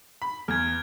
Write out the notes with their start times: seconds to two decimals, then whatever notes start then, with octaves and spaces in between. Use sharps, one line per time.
0.22 B5
0.48 E2 F6 G#6